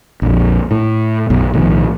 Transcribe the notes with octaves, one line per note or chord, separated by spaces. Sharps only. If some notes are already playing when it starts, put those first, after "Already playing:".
A#1 F2
A2 A3
B1 F#2
B1 A2 D#3 F3